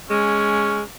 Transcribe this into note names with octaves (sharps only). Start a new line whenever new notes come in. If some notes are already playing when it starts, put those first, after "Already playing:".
G#3 C#4